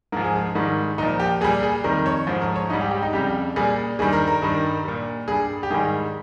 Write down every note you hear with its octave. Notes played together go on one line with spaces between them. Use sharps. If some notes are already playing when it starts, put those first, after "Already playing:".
G#2 F3 A#4
G#4
A#4
G#2 D#3 G3
A#2 F3 D#4
G4
A#2 G3 G#4
G#4
F2 D#3 G3 A#4
C#5
G#2 F3 C5
A#4
C#5
G#2 G3 D#4
G4
G4
D#4
F2 C#3 G3 G4
A#2 G3 G#4
G2 D#3 G3 G#4
A#4
A#4
G2 D#3 G3
A#2 G3
G2 G3 G#4
G4
G#2 D#3 G3 G#4